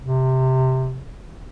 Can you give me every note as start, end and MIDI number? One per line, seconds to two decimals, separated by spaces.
0.02 1.06 48